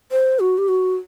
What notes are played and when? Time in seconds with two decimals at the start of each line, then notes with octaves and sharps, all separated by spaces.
0.11 C5
0.40 F#4
0.58 G4
0.68 F#4